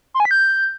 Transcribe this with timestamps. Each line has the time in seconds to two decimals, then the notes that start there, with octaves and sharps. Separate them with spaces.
0.14 C6
0.20 G#5
0.25 B6
0.31 G6